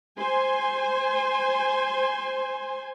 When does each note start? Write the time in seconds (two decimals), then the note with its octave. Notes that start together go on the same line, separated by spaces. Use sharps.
0.19 C5 G#5 C6